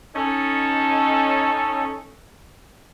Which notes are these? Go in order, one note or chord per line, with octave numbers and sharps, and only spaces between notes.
C#4 D#4 A4